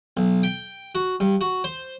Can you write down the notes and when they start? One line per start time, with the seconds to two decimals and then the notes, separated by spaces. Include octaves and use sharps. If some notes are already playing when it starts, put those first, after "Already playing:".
0.17 B1
0.43 G5
0.95 F#4
1.20 G2
1.41 F#4
1.64 C5